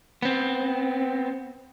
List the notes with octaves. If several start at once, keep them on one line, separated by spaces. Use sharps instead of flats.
B3 C4